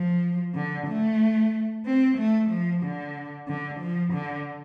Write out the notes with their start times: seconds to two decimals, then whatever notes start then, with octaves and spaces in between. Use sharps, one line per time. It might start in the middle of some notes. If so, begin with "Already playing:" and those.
Already playing: F3
0.55 D3
0.88 A3
1.85 C4
2.18 A3
2.50 F3
2.83 D3
3.48 D3
3.80 F3
4.13 D3